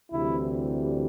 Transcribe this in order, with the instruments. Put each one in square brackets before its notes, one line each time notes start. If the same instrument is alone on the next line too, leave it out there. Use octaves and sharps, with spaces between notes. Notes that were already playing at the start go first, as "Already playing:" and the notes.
[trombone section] D2 C3 E3 G3 E4